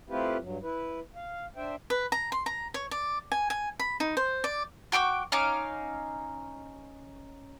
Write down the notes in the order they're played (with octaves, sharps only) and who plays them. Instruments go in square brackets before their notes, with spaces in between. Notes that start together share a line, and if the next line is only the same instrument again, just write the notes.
[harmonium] A3 C4 E4 F4 G4 B4
G2 F#3
E4 B4
F5
D4 C5 E5 G5
[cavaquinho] B4
A#5
C6
A#5
C#5
D5
G#5
G#5
B5
D#4
C5
D5
[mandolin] F#4 G5 C#6 D6
C#4 D#4 F5 D6